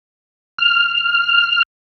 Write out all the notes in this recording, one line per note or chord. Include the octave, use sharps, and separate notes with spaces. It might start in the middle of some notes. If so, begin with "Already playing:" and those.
F6